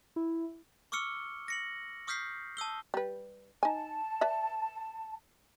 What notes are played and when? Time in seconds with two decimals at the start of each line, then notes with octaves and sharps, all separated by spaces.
0.16 E4
0.92 C#6 D6 E6 F6 C#7 G7
1.48 A#6 C#7 F#7
2.07 C#6 D#6 F6 G6 B6 C7
2.57 A5 D#6 E6 G7
2.94 G3 B4
3.63 D#4 G#5 A5
4.21 B4 D5 E5